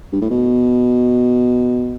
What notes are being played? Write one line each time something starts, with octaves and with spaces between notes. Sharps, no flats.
G2
A2
B2